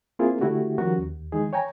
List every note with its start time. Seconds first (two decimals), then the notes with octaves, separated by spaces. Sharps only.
0.19 A#3 C4 E4 F4 G#4 A#4
0.41 D3 A3 E4 F#4 G4
0.78 D#3 F3 G3 C#4 F#4 A#4
0.99 D#2
1.32 D#3 E3 G#3 D#4 G#4
1.53 C#5 G5 G#5 A#5